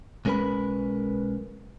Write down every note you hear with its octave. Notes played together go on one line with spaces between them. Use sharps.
B1 G#3 C#4 A#4 B4 B5